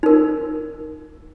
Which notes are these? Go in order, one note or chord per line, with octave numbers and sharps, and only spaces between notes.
D#4 A#4